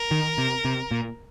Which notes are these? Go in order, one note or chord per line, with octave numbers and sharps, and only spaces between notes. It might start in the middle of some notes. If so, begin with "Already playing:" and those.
Already playing: A#4
D#3
C3
C3
A#2